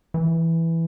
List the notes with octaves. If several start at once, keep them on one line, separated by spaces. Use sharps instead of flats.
E3